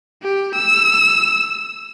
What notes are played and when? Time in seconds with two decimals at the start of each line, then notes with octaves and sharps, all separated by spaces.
0.23 G4
0.55 E6